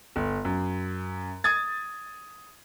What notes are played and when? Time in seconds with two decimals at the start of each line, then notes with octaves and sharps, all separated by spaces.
0.16 G1
0.45 F#2
1.44 D#6 G#6 A6